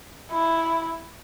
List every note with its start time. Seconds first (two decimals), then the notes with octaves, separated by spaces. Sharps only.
0.32 E4